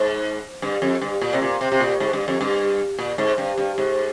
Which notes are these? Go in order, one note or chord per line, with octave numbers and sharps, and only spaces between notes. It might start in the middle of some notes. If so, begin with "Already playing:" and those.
Already playing: G#2
G2
F2
G2
A#2
C3
A#2
C3
C3
A#2
G#2
G2
F2
G2
A#2
G#2
G2
G2
G#2